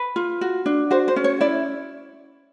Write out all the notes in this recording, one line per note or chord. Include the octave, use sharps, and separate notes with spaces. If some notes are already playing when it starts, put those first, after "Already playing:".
Already playing: B4
F4
F#4
D4
F#4 C5
C5
C#4
C#5
E4 D5